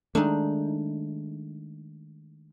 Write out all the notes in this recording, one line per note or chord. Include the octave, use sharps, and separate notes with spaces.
D#3 G#3 A3 D4 D#4